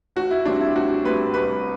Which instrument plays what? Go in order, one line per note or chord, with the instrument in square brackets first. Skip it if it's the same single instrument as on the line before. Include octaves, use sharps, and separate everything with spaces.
[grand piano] A1 F#4
E4
A2 G3 C4 D4
E4
A1 F#4
A2 G3 C4 B4
C2 B4